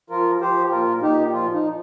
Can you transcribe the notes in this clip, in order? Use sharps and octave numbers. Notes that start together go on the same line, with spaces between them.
F3 F4 A#4
F3 G4 C5
A#2 F4 A#4
A#2 D#4 G4
F3 F4
D#4
F3